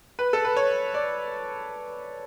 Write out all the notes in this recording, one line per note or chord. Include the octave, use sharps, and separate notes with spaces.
B4
A4
B4
C#5
D5